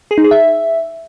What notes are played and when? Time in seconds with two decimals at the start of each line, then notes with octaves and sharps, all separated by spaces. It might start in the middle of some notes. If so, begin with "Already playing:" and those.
0.11 G#4
0.18 D#4
0.24 G#4
0.31 E5